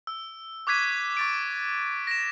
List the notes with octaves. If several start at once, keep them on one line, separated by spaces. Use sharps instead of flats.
E6
C#6 D6 F#6 G#6 B6 D#7
C#6 A6 D7
A#6 E7